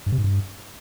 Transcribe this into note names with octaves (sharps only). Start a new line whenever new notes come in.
G2
C3
G#2
G2